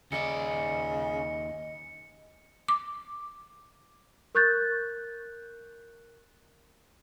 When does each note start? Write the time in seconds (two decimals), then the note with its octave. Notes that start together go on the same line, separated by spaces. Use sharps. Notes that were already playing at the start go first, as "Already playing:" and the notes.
0.12 D#2 C#3 D5 D#5 C#7
2.68 D6
4.35 A#4 C#6 F#6 G6 A6